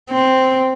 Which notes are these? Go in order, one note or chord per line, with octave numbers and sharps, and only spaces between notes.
C4